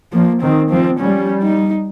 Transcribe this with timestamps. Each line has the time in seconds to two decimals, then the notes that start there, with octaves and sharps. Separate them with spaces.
0.12 F3 A#3
0.42 D#3 C4
0.70 F3 C4
0.99 G3 C#4
1.43 D#4